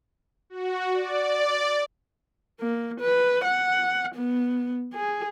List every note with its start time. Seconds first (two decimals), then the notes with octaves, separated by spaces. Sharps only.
0.50 F#4
0.93 D5
2.60 A#3
3.00 B4
3.44 F#5
4.15 B3
4.94 G#4